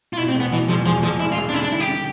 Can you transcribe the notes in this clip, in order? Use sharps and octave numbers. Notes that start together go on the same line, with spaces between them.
F4
B2 E4
C4
E1
B3
B2 E3
E1 F3
E2 F3
E1 F3
E1 E4
F4
E1
D4
D3 E4
D4
G3 E4
G4
D3